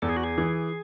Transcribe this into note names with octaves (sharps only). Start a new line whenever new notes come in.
E2 A4
G#4
F#4
G#4
E3